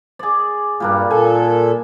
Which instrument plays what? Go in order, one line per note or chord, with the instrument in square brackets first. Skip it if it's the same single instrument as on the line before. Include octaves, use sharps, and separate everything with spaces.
[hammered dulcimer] G#4 D5
[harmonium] G2 [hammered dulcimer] A#2 G3 D4
[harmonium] A#2 A4 [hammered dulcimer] G#5